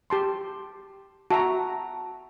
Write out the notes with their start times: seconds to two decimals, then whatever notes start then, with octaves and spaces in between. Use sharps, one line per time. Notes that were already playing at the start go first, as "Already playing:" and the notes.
0.10 G4 A5 C6
1.31 F#4 E5 A5 A#5